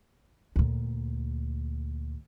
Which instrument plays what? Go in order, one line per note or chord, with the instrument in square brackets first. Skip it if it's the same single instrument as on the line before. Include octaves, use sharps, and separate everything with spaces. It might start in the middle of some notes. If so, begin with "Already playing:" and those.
[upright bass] D2 A#2